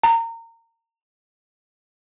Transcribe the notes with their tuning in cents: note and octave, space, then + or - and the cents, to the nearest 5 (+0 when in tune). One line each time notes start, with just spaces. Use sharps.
A#5 -25